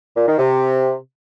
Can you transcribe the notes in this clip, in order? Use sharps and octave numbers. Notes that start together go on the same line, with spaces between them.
A#2
D#3
C3